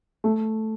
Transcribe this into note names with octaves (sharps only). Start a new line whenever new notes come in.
A3